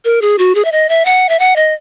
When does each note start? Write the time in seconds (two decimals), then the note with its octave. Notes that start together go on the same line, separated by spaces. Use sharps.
0.05 A#4
0.22 G#4
0.38 F#4
0.55 G#4
0.65 E5
0.72 D#5
0.89 E5
1.05 F#5
1.29 E5
1.39 F#5
1.56 D#5